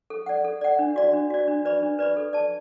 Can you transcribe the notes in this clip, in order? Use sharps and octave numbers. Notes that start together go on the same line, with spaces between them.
A4
D5 F#5
A4
D5 F#5
D4
F#4 D5
D4
F#4 D5
D4
B4 D5 B5
D4
B4 D5 B5
A4
D5 A5